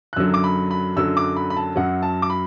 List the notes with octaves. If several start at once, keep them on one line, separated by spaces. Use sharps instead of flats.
F#6
F#2 D3 F#3 E6
D6
B5
B5
F#2 D3 F#3 E6
D6
B5
B5
A5
F#2 F#3 F#5
A5
D6
B5